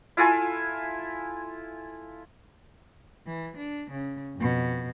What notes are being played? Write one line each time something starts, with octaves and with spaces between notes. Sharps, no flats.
E4 F4 A4 G#5
E3
D4
C#3
F2 B2